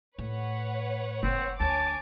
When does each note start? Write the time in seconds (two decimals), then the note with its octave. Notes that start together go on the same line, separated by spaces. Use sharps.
0.18 A2 B4 C#5 F#5
1.23 F#1 C4
1.60 D2 D4 C#5 G#5 A5 D6